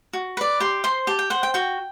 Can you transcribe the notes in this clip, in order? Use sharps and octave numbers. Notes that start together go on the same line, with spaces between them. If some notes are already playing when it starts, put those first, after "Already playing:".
F#4
B4 D5
G4 C6
C5 C6
G4 A5
G5
C5 F#5
G5
F#4 G5